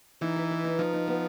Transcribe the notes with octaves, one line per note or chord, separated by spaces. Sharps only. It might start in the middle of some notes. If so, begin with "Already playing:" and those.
E3 D#4
B4
B4
D#4
F3 D#4
D#4
B3